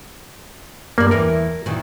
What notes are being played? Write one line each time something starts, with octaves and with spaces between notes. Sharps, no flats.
G2 A#3 D5
E2 E3 A#4
A#2 D#3 E3